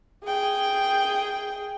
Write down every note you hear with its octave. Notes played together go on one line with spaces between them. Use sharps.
G#4 G5